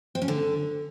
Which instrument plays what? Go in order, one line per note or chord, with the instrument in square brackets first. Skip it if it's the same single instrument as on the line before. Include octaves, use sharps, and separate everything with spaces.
[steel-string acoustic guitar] C4
C#4
D3